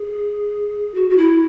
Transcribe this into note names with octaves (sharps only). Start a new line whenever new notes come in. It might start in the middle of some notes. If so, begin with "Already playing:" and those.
Already playing: G#4
F#4
F#4
E4